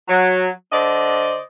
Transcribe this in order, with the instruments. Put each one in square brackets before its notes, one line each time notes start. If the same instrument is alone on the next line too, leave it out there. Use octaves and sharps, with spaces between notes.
[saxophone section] F#3
D3 C5 D5 D#5